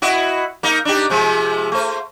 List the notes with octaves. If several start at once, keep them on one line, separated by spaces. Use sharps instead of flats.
E4 F#4 D#5
A#3 D#4 A#4
D4 D#4 G4
C3 F3 G#3
A3 C5